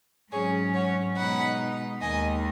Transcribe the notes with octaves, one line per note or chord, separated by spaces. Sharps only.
G#2 F#3 C#4 G#4 C#5
C#5 F#5
B2 G#3 D#4 F#5 B5
D#2 D#3 G#3 D#5 G#5